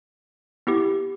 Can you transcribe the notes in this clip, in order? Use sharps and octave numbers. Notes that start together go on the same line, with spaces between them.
B3 E4 G4